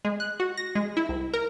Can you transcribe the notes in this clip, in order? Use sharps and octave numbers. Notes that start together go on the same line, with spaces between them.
G#3
F#6
F#4
A#6
G#3
E4
C2
A#4